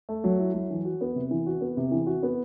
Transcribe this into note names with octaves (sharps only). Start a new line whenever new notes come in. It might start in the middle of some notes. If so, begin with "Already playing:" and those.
A3
F#3
E4
F#3
E3
F#4
B3
C3
E3
F#4
B3
C3
E3
F#4
B3